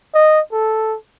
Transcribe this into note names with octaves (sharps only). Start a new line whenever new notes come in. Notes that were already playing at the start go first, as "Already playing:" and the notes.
D#5
A4